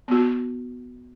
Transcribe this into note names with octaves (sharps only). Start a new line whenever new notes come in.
B3 F#4